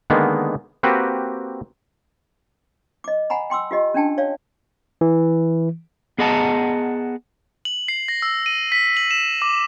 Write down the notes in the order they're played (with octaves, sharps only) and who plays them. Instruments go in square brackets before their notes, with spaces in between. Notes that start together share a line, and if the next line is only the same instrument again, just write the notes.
[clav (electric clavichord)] D3 D#3 G#3 A#3 B3
A#3 C4 F#4 G4 B4
[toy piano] D#5 D6
F#5 G#5 A#5 B5
G5 C6 D6 E6
F4 G4 D#5
C#4 D4 G5 A5
C#5 D5 F5
[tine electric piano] E3
[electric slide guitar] B3 G#4 D#5 F#5 A5 A#5
[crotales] F#7
C7
A#6
E6
D#7
B6
F#7
E7
D6